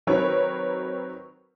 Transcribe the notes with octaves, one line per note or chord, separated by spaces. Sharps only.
D#3 F#3 C4 A#4 B4 C#5